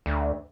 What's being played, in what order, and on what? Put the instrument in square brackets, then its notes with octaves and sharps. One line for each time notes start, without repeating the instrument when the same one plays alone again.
[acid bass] D2